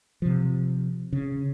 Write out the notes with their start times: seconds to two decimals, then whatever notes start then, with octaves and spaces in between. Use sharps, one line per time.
0.22 C3 F3
1.13 C#3